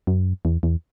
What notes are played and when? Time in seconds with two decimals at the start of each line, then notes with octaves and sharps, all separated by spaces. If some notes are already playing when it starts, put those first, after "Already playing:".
0.07 F#2
0.45 E2
0.63 E2